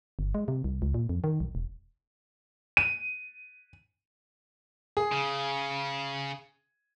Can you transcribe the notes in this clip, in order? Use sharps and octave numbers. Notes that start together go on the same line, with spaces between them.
G1
G#3
C3
C2
C#2
A#2
F2
D#3
B1
E1
D#7
G#4
C#3